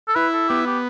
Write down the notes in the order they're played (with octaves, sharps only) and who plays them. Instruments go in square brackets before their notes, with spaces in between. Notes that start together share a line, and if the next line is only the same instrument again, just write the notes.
[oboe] A4
[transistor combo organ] E4 [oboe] B4
[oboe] A4
[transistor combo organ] B3 [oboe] G4
[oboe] G4